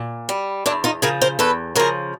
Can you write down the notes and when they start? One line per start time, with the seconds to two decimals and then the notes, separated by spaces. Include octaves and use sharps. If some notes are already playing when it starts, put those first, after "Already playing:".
Already playing: A#2
0.29 G3
0.66 E2 D4 E4
0.84 D#4 F4
1.02 C#3 F3 G#4 A#4
1.21 A#4 C5
1.39 E2 A4 B4
1.75 C#3 F3 G#4 A#4